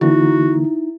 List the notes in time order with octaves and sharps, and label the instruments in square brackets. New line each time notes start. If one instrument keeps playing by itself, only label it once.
[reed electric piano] D3 E3 A#3 [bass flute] D#4 [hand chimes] E4 [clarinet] F#4